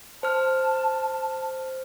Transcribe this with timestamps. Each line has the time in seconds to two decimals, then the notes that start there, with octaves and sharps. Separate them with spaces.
0.23 C5 A5 F6